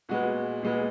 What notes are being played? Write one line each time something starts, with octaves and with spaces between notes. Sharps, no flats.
A#2 G#3 B3 F#4
A#2 G#3 B3